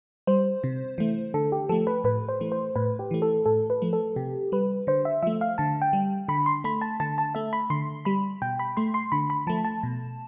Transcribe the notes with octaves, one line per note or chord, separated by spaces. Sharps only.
G3 C5
C3
E3 A3
D3 A4
G4
F3 A3 A4
B4
A2 B4
C5
E3 A3
C5
A2 B4
G4
E3 A3
A4
A2 A4
B4
F3 A3
A4
C3 G4
G3 B4
D3 C5
E5
F3 A3 E5
F5
D3 A5
G5
G3
D3 B5
C6
A3 B5
A5
D3 A5
A5
A3 E5
B5
D3 C6
G3 B5
B2 G5
B5
A3 C6
C6
D3 B5
B5
F3 A3 A5
A5
B2